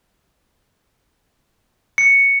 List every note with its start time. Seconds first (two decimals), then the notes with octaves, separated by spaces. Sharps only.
1.98 C#7